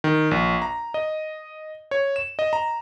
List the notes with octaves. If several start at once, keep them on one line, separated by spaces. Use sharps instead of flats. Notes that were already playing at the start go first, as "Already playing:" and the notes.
D#3
A#1
A#5
D#5
C#5
E7
D#5
A#5